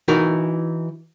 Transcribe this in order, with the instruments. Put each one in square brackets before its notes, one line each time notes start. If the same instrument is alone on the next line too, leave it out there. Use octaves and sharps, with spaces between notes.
[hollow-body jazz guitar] E3 D#4 F#4 A#4